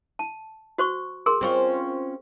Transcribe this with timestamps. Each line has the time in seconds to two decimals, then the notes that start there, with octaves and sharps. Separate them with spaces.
0.19 A5
0.78 F#4 C5 C#6
1.26 G#4 A#4 C6
1.41 C4 C#4 F4